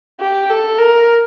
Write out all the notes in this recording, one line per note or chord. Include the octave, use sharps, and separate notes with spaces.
G4
A4
A#4